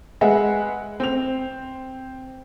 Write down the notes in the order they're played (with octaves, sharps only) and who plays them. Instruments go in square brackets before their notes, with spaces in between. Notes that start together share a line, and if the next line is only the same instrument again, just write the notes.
[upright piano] G#3 B4 E5 F#5 G#5
C4 F7